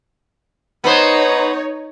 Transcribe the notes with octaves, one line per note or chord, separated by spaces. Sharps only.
B3 D#4 C5 C#5